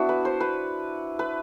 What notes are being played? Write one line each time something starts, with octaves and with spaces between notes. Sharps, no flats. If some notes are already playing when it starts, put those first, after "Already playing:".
Already playing: B3 D4 E4 F#4
B4
C5
B4
B4